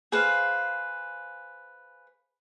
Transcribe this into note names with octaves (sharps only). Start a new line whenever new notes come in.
G#4 B4 C5 F5